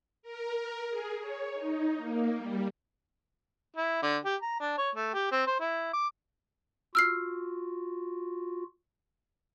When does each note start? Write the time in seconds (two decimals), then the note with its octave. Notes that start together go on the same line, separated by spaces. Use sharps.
0.23 A#4
0.56 A#4
0.90 G#4
1.20 C#5
1.53 D#4
1.97 A#3
2.37 G3
3.77 E4
4.02 D3
4.25 G4
4.42 A#5
4.60 D4
4.78 C#5
4.96 A3
5.14 G4
5.32 C4
5.47 C5
5.60 E4
5.93 D6
6.95 F4 F#4 E6 F6 C7